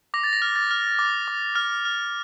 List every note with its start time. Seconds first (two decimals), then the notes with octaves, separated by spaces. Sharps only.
0.14 D6 A#6
0.24 A6
0.33 A#6
0.42 F6
0.56 A6
0.71 F6
0.99 D6
1.28 D6
1.56 F6
1.85 F6